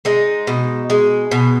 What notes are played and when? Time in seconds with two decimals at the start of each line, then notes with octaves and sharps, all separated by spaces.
0.05 G#3 D#4
0.47 B2
0.90 G#3
1.31 B2